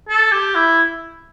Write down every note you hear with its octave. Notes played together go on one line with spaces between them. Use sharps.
A4
G4
E4